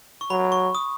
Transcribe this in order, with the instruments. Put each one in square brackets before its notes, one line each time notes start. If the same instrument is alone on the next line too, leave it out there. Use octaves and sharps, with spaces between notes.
[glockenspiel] C#6
[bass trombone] F#3 [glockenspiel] B5
[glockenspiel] C#6
D#6